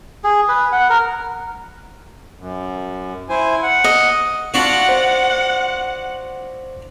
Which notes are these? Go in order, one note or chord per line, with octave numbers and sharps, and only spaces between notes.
G#4
B4
F#5
A#4
F#2
E4 C5 G#5
F#5
D#5
D4 F4 F#4 F#5
C5